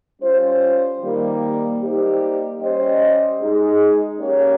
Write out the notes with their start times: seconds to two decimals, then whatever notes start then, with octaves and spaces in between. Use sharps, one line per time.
0.22 G3 C#4 F4 C5
1.01 D#3 G3 A#3
1.81 G3 A#3 D#4 G4 C5
2.60 G3 C#4 G4 C5 D#5
3.39 G#3 D#4 G#4
4.19 A#3 C#4 G4 C#5